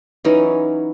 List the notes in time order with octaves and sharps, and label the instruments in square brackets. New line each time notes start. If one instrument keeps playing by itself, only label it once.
[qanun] E3 F#3 C#4 D#4